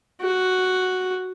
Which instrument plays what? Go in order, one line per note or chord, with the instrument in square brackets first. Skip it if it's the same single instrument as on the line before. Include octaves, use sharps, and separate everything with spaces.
[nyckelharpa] F#4